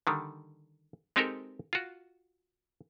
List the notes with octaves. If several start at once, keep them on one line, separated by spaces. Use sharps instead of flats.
D3 D#3 G3
G#3 C4 D#4 G4 A4 A#4
F4 F#4